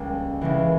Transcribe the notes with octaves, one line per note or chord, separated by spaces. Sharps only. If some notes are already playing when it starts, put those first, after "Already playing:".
Already playing: C#2 C#3 G3 A#3
C#2 C#3 E3 A#3